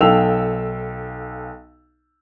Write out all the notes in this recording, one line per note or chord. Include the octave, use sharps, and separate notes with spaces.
B1 A4 F5 G5 E6 F7